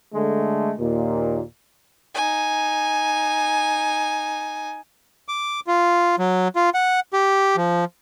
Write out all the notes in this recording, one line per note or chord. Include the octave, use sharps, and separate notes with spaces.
D3 G#3 A3
D#2 A#2
D#4 G#5
D6
F4
F#3
F4
F#5
G4
F3